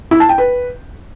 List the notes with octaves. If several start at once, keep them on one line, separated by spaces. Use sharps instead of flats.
E4
A5
G5
B4